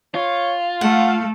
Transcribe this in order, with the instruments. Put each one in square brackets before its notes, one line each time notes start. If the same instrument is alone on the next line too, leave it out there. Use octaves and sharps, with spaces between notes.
[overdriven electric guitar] F4 [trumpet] C#5
[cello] A3 [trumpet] F5 [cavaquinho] F#5